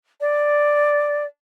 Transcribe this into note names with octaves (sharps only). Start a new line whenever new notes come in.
D5